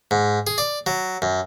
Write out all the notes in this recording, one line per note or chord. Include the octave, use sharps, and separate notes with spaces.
G#2
G#4
D5
F#3
F#2